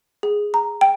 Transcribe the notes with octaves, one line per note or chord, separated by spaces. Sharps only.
G#4
A#5
G5